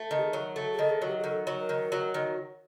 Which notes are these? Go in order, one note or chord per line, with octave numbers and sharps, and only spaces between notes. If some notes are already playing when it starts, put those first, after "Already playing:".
Already playing: A3
D#3
G4
G#4
F#3
A3 A4
G#4
D#3 A4
G#4
F#3
G4
G#4
D#3 A4
F#3
A#4
D#3
F#3
D#3